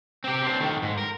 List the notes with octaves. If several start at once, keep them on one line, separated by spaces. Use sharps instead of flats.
C4 G4
C4 D4
D#3 A3
G#2
A#4